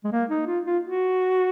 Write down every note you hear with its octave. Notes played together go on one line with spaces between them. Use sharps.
G#3
A#3
D#4
F4
F4
F#4